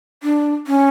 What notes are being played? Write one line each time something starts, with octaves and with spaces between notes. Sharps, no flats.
D4
C#4